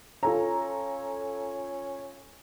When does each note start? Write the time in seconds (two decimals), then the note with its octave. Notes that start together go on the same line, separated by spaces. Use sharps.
0.23 C#4 F4 A4 A#5